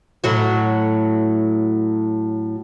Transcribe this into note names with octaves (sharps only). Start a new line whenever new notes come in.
A2 F#3 F#4